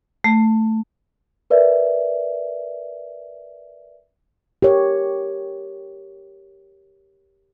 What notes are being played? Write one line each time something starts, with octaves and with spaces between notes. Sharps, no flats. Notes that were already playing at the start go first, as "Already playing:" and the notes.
A3
A#4 B4 D5 E5
G4 A#4 C#5